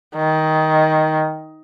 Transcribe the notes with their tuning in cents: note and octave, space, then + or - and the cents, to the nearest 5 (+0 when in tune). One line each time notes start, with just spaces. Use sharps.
D#3 +10